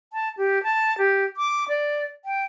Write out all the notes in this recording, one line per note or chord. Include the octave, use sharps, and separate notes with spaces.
A5
G4
A5
G4
D6
D5
G5